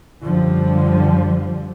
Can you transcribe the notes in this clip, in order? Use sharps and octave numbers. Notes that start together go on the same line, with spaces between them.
F#2 D3 F3 G3